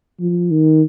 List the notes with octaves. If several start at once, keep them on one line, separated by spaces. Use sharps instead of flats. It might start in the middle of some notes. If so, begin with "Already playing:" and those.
F3
D#3